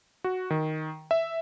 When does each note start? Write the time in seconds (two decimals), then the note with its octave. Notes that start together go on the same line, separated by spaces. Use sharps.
0.24 F#4
0.50 D#3
1.11 E5